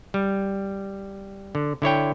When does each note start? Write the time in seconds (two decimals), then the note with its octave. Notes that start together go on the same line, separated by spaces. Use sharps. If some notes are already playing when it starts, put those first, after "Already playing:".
0.14 G3
1.55 D3
1.82 D3 E4 C#5 G5